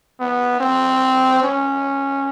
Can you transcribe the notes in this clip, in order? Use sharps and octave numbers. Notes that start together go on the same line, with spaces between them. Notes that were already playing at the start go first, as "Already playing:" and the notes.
B3
C4
C#4